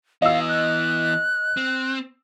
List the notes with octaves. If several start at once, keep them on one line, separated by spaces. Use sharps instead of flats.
E3 B3 D#5 F5 E6
F#6
C4